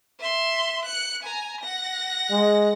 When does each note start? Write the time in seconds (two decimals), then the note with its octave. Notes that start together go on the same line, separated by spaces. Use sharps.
0.19 E5 C6
0.85 F#6 C#7
1.23 G#5 A#5
1.61 F#5 A#6
2.31 G#3